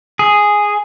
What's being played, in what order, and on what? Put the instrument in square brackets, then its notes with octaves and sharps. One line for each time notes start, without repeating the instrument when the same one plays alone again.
[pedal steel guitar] G#4